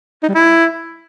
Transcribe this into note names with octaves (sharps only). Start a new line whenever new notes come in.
D#4
G3
E4